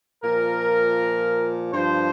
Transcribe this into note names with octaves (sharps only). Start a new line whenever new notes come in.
A#2 F3 A#4
G2 F3 C5